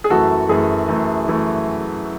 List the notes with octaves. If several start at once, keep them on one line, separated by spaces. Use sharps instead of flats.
G#4
F#2 E3 A3 F#4 A4
F#2 E3 A3 G#4
F#2 E3 A3
E3 A3